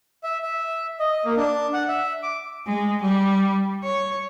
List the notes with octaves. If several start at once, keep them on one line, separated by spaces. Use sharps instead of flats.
E5
E5
D#5
A#3
D4
F#5
E5
D6
G#3
G3
C#5